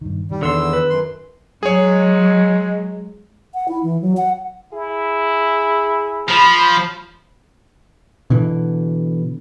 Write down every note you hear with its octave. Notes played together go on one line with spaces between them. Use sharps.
G2 D#3
D#3 G3
E2 D3 C6 E6
B4
F#2 C6
F#3 G#3 G#4 C#5
F#5
E4
E3
F#3
F#5
E4 G#4
F3 B5
B2 D3 E3